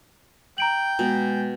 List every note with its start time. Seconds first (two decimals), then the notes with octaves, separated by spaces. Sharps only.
0.58 G5 A#5 D7 F#7
0.99 B2 G#3